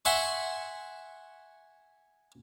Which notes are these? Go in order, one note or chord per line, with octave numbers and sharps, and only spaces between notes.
E5 F#5 G#5 C6 C#6